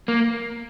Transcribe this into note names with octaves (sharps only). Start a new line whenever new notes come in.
A#3